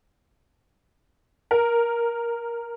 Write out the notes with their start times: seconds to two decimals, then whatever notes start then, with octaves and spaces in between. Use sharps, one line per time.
1.51 A#4